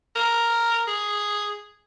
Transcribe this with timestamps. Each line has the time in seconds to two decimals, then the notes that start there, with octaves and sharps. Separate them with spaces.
0.16 A#4
0.87 G#4